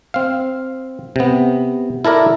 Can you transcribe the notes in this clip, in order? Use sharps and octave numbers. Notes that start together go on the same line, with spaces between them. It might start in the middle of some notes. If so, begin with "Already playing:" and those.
C4 F5
C3 B3
E4 A4 A#4 D5